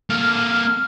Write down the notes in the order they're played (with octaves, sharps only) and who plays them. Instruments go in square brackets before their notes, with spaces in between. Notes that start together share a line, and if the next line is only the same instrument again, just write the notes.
[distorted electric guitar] A#3 A4 [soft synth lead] F6